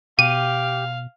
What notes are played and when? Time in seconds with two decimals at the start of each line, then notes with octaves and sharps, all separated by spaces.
0.19 B2 G4 F5 D#7